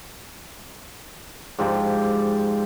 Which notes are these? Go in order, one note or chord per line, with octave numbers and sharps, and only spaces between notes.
G#2 F3 G4 D5